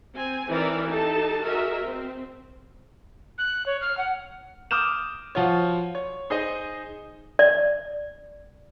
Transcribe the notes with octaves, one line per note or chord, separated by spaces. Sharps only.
C4 G#5
E3 C4 D#4 A#4 D5 E5
D#4 G4 A4 A5
F#4 G#4 A#4 D#5 E5
C4
F#6
C#5
F6
F#5
D6 D#6 F6 G6 E7
F3 F4 F#4 C#5
C#5
D#4 G#4 C5 D#5
D5